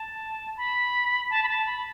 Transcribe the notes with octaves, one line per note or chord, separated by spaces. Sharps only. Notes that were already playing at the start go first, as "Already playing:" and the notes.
Already playing: A5
B5
A5
B5
A5
B5